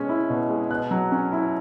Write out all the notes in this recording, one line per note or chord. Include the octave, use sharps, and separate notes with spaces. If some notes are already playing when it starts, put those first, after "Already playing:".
Already playing: B2 G#3 C#4
E4
B2
G#3
B2 F#6
F#3
C#4
E4